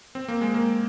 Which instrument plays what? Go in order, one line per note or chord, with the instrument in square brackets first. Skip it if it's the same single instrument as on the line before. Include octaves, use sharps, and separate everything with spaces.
[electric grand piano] C4
A#3
G#3
A#3